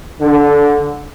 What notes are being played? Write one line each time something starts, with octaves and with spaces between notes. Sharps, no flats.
D3